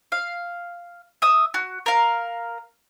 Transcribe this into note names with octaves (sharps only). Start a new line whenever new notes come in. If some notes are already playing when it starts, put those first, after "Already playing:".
F5
E5 D#6
F#4
A#4 F5